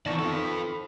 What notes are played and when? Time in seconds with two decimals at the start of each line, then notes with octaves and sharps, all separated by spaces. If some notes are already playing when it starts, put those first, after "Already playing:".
0.06 D#3 E3 B3 D5 A5 C#6
0.19 F4 A4
0.31 B4 B5